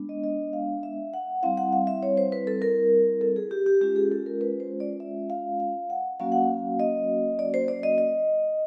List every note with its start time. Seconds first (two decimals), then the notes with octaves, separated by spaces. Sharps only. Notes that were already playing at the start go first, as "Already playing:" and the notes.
Already playing: G#3 B3 D4
0.09 D#5
0.24 D#5
0.53 F5
0.83 E5
1.14 F#5
1.43 G3 C4 E4 F5
1.58 F#5
1.73 F5
1.87 E5
2.03 C#5
2.17 C5
2.32 B4
2.47 A4
2.62 A#4
3.21 A4
3.36 G#4
3.51 G4
3.66 G4
3.81 G#3 C#4 F4 G4
3.96 G#4
4.11 A4
4.26 A#4
4.41 B4
4.60 C5
4.80 D5
5.00 E5
5.30 F5
5.60 F5
5.90 F#5
6.20 F#3 A#3 C#4 F#4 F5
6.32 F#5
6.44 F5
6.80 D#5
7.39 D5
7.54 C5
7.68 D5
7.83 D#5
7.98 D#5